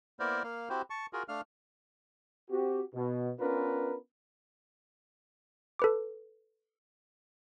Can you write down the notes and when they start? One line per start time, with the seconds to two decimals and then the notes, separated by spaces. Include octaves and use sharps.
0.20 A#3 B3 E4 A#4 C5 D5
0.44 A#3 F5
0.70 C4 E4 F#4 G4 C5
0.90 A5 C#6
1.13 F4 F#4 G#4 A#4
1.28 A3 D4 F5 F6
2.51 C4 F#4 G4
2.95 B2
3.40 B3 C#4 D4 F4 A#4 B4
5.79 A4 B4 D6